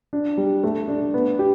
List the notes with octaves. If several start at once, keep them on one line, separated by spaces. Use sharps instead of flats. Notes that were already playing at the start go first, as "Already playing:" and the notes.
D4
G3
A3
D4
B3
G4